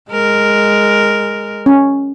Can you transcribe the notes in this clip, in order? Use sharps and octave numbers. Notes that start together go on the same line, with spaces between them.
G#3 A#4
C#4